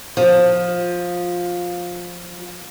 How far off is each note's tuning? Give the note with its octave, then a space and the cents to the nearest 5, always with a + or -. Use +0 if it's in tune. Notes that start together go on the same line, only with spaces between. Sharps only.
F3 +15